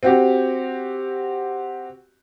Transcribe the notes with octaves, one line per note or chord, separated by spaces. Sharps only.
C4 F#4 G4